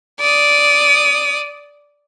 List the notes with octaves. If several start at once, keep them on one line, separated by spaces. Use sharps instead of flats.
D5 D#6